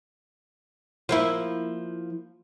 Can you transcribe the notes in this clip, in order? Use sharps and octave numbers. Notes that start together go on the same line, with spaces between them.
F3 A#3 E4